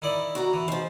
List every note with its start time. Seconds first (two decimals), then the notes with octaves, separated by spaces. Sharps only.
0.02 D#3 E4 D5
0.35 F#4 A#5
0.53 E3
0.68 G#2 F3 C5